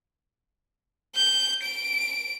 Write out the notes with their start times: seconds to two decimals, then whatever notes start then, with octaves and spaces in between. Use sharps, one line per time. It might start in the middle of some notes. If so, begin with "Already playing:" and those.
1.15 G6
1.63 D7